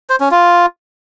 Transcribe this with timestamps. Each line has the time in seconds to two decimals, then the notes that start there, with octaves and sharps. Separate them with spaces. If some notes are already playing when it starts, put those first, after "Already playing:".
0.09 C5
0.20 C#4
0.31 F4